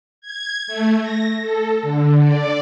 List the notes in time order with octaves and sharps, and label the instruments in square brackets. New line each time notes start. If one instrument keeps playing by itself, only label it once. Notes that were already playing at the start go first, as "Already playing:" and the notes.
[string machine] G#6
A3
A#6
A4
D3
D5